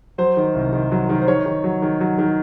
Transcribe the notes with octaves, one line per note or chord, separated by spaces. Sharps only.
F#3 C5
D#3
C2
D#3
F#3
D#3
C5
D#3 C#5
D#3
F#3
D#3
F#3
D#3